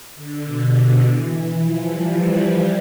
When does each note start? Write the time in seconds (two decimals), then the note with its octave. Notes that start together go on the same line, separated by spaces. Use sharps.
0.15 D3
0.43 B2
0.72 D3
1.02 E3
1.58 F3
1.88 G3